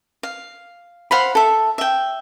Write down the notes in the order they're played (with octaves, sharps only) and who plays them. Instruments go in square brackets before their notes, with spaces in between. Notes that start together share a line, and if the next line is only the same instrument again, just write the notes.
[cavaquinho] F5
C5 F5 F#5 B5
A4 E5
E5 G5